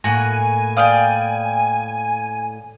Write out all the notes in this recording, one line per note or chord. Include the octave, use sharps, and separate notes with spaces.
A2 A#3 F#4 G#5 F#6
D5 F5 G5 D#6 F6